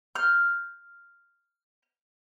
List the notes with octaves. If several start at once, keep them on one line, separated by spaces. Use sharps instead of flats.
F6 G6